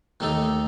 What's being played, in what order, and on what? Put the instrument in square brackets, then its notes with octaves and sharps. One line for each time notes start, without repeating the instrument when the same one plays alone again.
[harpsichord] D#2 D#3 A3 D#4 A4